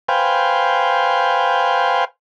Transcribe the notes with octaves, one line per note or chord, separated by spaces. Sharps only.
B4 C5 F5 G5 G#5